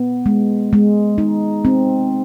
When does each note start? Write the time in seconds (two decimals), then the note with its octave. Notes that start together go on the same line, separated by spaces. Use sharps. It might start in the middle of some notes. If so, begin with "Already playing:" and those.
Already playing: B3
0.26 G#3
0.73 G#3
1.18 D#4
1.65 C4